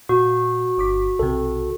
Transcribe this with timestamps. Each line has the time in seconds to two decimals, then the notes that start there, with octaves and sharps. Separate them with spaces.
0.09 A#2 F#4
0.78 G1 D6 B6
1.19 B1 C3 A4